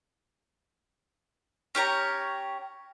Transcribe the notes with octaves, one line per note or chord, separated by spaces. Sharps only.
C#4 G4 C#5 A#5